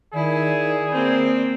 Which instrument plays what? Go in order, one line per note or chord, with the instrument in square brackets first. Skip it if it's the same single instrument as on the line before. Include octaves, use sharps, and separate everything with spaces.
[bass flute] D#3 [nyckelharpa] E4 [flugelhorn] G#4 [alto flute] D5
[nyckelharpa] A#3 C4